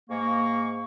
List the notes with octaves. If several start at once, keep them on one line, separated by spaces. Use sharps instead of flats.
G#2 A#3 C#6